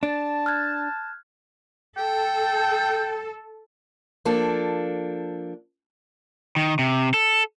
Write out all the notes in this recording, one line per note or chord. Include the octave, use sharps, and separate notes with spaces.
D4 A5
F6 F#6 G#6
A4 G5
F3 A#3 D4 A4
D#3
C3
A4